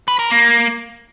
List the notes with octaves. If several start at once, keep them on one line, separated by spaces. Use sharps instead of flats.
B4
A#4
A#3